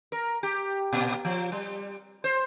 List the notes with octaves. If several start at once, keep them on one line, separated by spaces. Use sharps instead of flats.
A#4
G4
A#2
F3
G3
C5